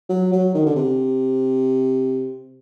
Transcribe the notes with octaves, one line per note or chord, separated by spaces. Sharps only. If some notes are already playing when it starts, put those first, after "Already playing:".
F#3
F#3
D#3
D3
C3